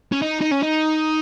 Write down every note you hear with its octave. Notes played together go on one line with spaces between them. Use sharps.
C#4
D#4
D#4
C#4
D#4